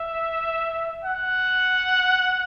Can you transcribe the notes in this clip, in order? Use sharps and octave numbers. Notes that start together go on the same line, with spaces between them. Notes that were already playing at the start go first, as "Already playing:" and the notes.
Already playing: E5
F#5